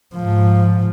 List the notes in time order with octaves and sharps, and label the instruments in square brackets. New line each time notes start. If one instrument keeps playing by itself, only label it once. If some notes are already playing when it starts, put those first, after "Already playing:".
[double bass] G#2 F3